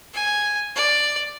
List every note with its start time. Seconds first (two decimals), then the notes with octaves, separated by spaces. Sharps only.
0.14 G#5
0.75 D5